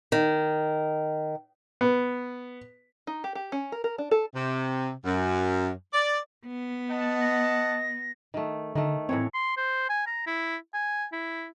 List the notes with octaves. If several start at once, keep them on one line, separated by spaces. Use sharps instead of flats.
D#3
B3
D#4
G4
G4
C#4
A#4
A#4
D4
A4
C3
F#2
D5
B3
D#5 F#5 A5
A#6
D#3 A3
D3 D#3 A3
A2 E3 C4 C#5
C6
C5
G#5
A#5
E4
G#5
E4